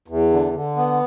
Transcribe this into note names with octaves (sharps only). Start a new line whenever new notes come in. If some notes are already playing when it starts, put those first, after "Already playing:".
E2
D3
D3
B3